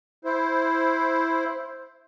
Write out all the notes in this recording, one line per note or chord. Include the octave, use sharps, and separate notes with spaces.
E4 C5